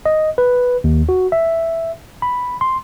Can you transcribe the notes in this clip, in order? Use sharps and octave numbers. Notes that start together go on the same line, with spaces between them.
D#5
B4
D#2
F#4
E5
B5
C6